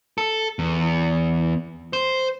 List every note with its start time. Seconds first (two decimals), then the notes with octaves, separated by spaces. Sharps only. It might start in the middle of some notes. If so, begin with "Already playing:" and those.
0.18 A4
0.59 E2
1.93 C5